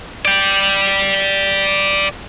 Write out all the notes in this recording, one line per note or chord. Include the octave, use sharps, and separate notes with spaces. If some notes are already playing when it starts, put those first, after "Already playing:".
D5 G5